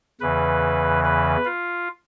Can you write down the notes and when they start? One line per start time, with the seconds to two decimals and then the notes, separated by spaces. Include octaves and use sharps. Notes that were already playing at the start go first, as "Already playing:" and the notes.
0.21 E2 C#3 E3 B4
1.04 B4
1.45 F4